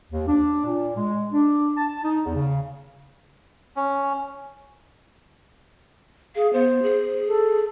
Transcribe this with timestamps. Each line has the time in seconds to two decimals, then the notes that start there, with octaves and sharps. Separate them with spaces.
0.11 D#2
0.27 D4
0.65 A#2
0.96 G#3
1.32 D4
1.77 A5
2.04 D#4
2.24 E2
2.36 C#3
3.76 C#4
6.36 G#4 F5
6.53 B3 C5
6.83 G#4
7.28 A4